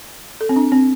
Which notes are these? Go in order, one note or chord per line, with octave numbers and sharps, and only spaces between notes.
A4
C4
D4
C4